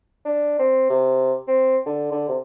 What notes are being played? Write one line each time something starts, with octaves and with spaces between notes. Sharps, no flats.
D4
C4
C3
C4
D3
D3
C3